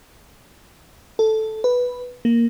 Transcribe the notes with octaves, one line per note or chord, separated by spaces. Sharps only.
A4
B4
A#3